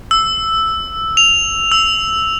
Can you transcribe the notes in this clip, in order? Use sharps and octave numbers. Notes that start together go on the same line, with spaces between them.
E6
F7
E6